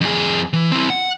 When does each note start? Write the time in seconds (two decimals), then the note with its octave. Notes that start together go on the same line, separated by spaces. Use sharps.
0.01 F2 G#4
0.53 E3
0.71 C4 E4
0.90 F#5